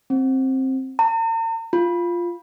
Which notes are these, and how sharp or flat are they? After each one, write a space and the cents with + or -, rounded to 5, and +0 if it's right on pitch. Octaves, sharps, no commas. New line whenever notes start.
C4 +15
A#5 -45
F4 -5